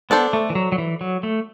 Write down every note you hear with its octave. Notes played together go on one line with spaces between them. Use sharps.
B3 D4 A4 C5
A3
E3
F#3
F#3
E3
F#3
A3